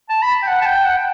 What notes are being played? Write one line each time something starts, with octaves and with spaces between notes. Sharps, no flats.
A5
B5
G5
F#5
A5
G5
F#5
G5